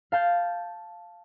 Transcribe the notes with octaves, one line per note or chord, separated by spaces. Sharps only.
F5 A5 G6